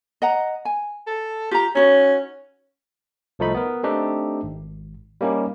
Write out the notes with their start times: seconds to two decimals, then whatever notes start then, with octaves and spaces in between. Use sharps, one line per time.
0.22 D#5 F#5 A#5
0.65 G#5
1.07 A4
1.51 F4 G4 A#5
1.75 C#4 D#4 F#4 C#5
3.39 C2 F3 A3 D#4 B5
3.55 B3 A#4
3.83 A3 C4 D4 D#4 G4
4.43 G#1
5.21 G3 A#3 C#4 D#4 G4